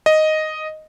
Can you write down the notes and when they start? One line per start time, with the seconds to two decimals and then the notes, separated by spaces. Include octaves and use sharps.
0.06 D#5